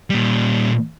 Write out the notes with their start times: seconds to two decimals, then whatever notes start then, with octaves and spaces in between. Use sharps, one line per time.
0.10 A#2 G3